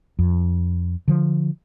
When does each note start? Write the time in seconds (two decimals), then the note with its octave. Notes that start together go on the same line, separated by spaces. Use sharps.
0.19 F2
1.08 D3 F3